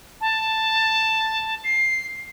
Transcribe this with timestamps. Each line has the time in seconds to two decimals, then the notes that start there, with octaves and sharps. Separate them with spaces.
0.21 A5
1.64 C7